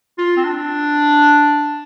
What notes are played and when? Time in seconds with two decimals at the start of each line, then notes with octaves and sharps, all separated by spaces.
0.18 F4
0.37 C4
0.45 D4